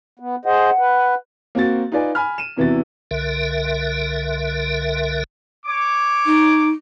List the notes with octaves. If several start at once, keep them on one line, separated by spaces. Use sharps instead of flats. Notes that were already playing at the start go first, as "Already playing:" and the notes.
B3
G#4 C5 D#5 F#5
B4
A#3 C4 F#4 A6
D#4 F4 B4 D5 G#5
G#5 B5 F6
D#7 E7
E2 C3 E3 E4 F#4 A6
C2 D3 A#4 E5
C#5 D6
D#4